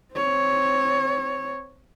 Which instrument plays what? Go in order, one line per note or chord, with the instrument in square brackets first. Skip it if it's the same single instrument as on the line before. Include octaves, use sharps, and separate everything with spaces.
[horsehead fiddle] C4 C#5